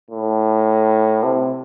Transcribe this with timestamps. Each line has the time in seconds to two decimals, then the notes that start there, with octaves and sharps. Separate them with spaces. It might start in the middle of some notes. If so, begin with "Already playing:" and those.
0.11 A2
1.24 C3